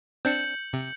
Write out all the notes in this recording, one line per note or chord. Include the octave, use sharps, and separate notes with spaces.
C4 D4 G6 C#7 F#7
C3